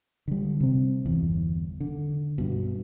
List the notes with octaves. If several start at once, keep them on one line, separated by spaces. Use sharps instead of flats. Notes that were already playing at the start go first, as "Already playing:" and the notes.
D3 G3
C3 C4
G1 E2
D3
G2 B2